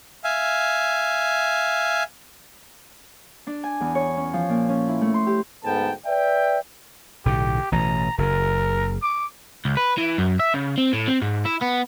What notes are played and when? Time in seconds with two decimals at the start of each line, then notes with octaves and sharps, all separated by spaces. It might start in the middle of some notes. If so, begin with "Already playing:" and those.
0.24 E5 F5 G#5
3.47 D4
3.64 G#5
3.81 E2
3.95 C#5
4.17 C#4
4.33 F3
4.49 A#2
4.69 C#4
4.88 E4
5.01 A3
5.14 C6
5.27 G4
5.64 D2 G#2 B3 A4 G5 A5
6.06 B4 D5 E5 G5
7.25 B1 A2 D3 G4
7.72 A1 B2 E3 A#5
8.18 F#1 C#3 A#4
9.02 D6
9.65 C#2
9.77 B4
9.98 E3
10.18 F#2
10.39 E5
10.54 C#3
10.78 C4
10.93 A2
11.08 C4
11.22 G#2
11.45 E4
11.61 B3